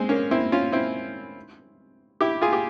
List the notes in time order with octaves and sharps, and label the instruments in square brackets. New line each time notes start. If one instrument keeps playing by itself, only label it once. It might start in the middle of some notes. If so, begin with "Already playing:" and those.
Already playing: [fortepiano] G#3 C4
A#3 C#4
C4 E4
C#4 F4
C4 E4
E4 G4
F4 G#4
G4